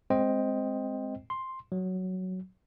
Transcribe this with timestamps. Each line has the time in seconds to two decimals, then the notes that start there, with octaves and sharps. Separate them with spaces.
0.10 G#3 C4 C5 D#5 G5
1.30 C6
1.72 F#3